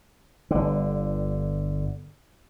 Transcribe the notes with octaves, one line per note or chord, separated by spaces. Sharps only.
G1 D3